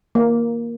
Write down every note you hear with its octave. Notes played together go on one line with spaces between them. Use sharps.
A#3